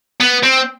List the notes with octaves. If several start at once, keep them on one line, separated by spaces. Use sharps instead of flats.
B3
C4